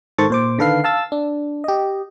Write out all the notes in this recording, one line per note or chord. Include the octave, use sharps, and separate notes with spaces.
G#2 D#3 A4 C5 C#6 A6
A#2 C5 D6
D3 D#3 A4 B4 F5 C7
F5 A5 E6 A6
D4
G4 D#5